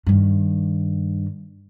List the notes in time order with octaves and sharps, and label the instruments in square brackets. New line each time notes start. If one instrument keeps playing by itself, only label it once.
[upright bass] G2 D#3